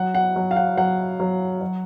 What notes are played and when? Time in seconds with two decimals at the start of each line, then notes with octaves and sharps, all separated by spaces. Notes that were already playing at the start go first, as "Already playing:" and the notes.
Already playing: F#3 F#5
0.15 F#5
0.36 F#3
0.51 F5
0.56 F#5
0.77 F#3 F#5
1.20 F#3
1.61 F#3